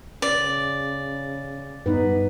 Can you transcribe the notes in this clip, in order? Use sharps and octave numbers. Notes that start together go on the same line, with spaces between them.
C#3 D5
G2 B3 D#4 B4